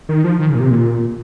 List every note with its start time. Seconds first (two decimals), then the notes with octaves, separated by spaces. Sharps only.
0.09 D#3
0.24 F3
0.39 D#3
0.50 C#3
0.55 A#2
0.60 C3
0.70 A#2